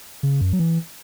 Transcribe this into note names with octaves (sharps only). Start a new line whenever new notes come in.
C#3
F#2
F#3
E3